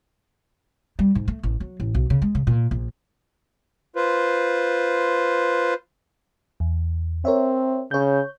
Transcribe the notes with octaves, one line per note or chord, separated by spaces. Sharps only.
G3
G#2
A3
A1
F#3
A1
B1
C#3
G#3
C#3
A#2
A#1
F4 B4 C5
E2
C4 A#4 C#5 E5
C#3 C#5 G6